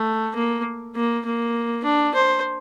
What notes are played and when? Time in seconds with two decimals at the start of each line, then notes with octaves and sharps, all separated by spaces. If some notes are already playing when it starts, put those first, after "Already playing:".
Already playing: A3
0.35 A#3
0.95 A#3
1.25 A#3
1.84 D4
2.14 C5